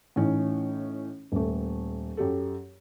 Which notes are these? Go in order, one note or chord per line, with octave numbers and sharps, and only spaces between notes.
A2 E3 C#4 D#4
D#1 A3
F#2 G4 A4